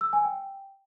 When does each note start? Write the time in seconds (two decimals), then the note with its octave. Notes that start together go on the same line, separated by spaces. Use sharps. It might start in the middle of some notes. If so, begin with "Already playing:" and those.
0.01 E6
0.13 G#5
0.25 G5